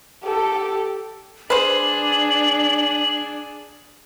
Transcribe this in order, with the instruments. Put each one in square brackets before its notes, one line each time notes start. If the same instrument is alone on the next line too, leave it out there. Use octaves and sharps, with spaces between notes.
[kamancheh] G4 A4
[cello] D4 [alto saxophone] G#4 [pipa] B4 C5 [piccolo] F#7